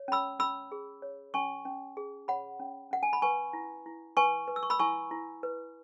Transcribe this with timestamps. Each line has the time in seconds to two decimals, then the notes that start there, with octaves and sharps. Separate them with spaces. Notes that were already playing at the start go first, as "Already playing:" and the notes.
Already playing: C#5
0.08 C#4 B5 E6
0.39 C#4 B5 E6
0.72 G#4
1.02 C#5
1.34 C#4 G#5 C#6
1.65 C#4
1.97 G#4
2.28 C#5 F#5 B5
2.60 C#4
2.91 C#4 F#5
3.03 G#5
3.13 B5
3.22 B4 G#5 C#6
3.53 E4
3.86 E4
4.17 B4 G#5 C#6
4.48 B4
4.56 E6
4.63 C#6
4.70 B5 E6
4.79 E4 G#5 C#6
5.11 E4
5.43 B4